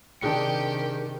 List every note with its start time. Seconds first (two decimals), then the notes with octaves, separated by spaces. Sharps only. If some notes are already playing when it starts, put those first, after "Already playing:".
0.21 C3 D#3 D4 G4 G#4 G5 C#7